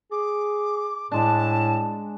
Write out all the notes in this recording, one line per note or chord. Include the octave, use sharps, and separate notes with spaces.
G#4 D6
A2 G#3 D4 A5